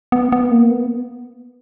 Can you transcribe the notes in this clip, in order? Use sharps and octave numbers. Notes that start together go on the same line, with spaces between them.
B3
B3
A#3
B3